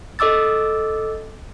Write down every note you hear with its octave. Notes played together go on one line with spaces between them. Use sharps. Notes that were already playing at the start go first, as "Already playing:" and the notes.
A4 D#5 D6 E6 A6